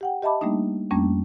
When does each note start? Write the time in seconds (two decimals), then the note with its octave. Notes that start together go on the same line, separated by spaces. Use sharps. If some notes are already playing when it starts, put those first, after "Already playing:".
0.01 G4 F#5 G5
0.22 G4 D#5 E5 A5 B5 D6
0.41 G3 A3 A#3 D4 D#4
0.91 F2 G3 A3 A#3 C#4 D4